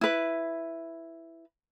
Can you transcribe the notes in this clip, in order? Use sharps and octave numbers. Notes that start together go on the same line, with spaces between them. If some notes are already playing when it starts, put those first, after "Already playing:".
E4 B4